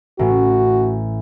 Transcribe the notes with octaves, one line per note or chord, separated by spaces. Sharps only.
A1 A2 F#4